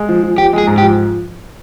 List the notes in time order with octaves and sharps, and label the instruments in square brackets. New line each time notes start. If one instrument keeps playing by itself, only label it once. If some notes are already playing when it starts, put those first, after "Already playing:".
Already playing: [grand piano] G#3
F3
F3
[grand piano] F3 [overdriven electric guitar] G4
[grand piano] G#3 [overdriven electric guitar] G#4
[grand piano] G#2
[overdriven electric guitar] G4
[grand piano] F3